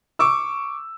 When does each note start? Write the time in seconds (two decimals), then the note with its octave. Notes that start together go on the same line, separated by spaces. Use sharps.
0.19 C#6 D6 E6